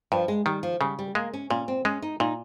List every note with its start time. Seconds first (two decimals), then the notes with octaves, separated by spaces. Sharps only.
0.12 G2 F3
0.28 G#3
0.46 D#3 G3
0.63 F3
0.81 C#3 G3
0.99 G3
1.15 G#3 A#3
1.34 C#4
1.50 A#2 C#4
1.68 C4
1.85 G#3 C#4
2.02 D#4
2.20 A#2 D#4